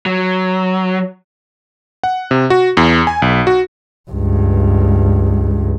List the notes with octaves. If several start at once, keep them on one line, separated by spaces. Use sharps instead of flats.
F#3
F#5
C3
F#4
E2
G#5
B1
F#4
C#2 G2